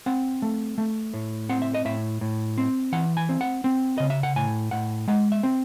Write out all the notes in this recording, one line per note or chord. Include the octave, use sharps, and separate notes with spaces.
C4 F#5
A3
A3
A2
C4 F#5
E5
D#5
A2 E5
A2
C4
E3 F#5
G#5
C4
F#5
C4
C#3 D#5
E5
F#5
A2 G#5
A2 F#5
G#3 F#5
E5
C4